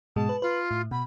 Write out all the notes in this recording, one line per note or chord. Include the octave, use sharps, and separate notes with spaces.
G#2 B2 G#3 A5
B4
F4 B4
A2
B2 B5